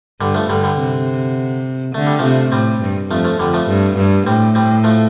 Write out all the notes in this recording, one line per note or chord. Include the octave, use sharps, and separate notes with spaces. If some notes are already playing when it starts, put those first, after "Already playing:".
G2 D3 G3
F3 A3
G2 D3 G3
D3 G3
C3
D3 A3
G3
C3 F3 A3
A2 G3 C4
G2
F2 F3 A3
F3 A3
F2 D3 G3
F3 A3
G2
G2
A2 G3 C4
G3 C4
F3 A3